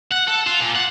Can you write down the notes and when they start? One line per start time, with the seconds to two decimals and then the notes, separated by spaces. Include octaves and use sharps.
0.12 F#5
0.28 A4
0.47 F4
0.61 A#2
0.76 F#5